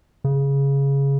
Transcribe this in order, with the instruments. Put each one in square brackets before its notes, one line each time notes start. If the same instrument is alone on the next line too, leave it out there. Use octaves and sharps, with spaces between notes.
[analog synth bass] C#3